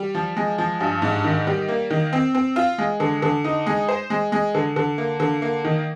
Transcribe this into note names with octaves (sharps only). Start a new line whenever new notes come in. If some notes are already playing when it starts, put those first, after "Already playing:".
Already playing: G3
F3
G#3
F3
G2
G#2
D#3
G3
A#3
D#3
C4
C4
F4
G#3
D3
D3
D#4
G#3
C5
G#3
G#3
D3
D3
A#3
D3
A#3
D#3